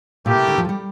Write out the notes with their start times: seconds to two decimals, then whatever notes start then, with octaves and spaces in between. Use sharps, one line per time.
0.25 A#2 A3 E4 G4 A#4
0.35 C3
0.47 D2 D3
0.58 F2 F3
0.69 G3